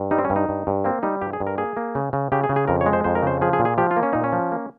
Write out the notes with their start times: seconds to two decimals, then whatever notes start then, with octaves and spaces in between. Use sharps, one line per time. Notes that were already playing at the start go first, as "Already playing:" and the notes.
Already playing: G2
0.11 G3 D#4
0.18 C4
0.25 C#4
0.30 G2
0.36 D#4
0.49 G2
0.67 G2
0.84 A#3 C4
1.03 G3 D#4
1.21 G2 G4
1.33 G#4
1.40 G2
1.47 A#4
1.58 A#3 G#4
1.77 A#3
1.95 C#3
2.13 C#3
2.32 C#3 G4
2.44 G#4
2.49 C#3
2.56 G#4
2.68 F2 A#4
2.81 C#5
2.86 G#3
2.93 C5
3.04 F2 C5
3.15 A#4
3.22 C#3 C5
3.41 F3 G#4
3.53 G#4
3.59 A#2
3.65 G#4
3.78 F3 G4
3.91 F4
3.97 A#3
4.03 C#4
4.13 A#2 D#4
4.24 C#4
4.32 F3
4.52 A#3